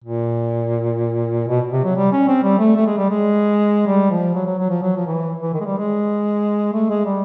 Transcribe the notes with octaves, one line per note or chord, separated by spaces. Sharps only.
A#2
B2
C3
F#3
G3
C#4
C4
G3
A3
A3
G#3
G3
G#3
G3
F3
F#3
F#3
F#3
F3
F#3
F3
E3
E3
D#3
G#3
G3
G#3
A3
G#3
G3